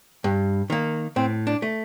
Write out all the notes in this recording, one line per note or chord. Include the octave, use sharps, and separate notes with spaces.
G2
D#3 A#3
A2 C4
D4
A3